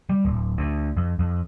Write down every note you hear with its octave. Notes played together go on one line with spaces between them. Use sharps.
G3
D1
D2
F2
F2